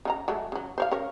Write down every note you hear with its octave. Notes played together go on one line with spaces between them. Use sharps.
C#3 D#4 A#5
F#3 G#3 A3
C#3 F#3
C5 C#5 F5
C#4 A#4 C#5